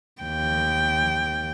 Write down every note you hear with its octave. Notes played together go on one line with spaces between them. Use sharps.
D#2 G5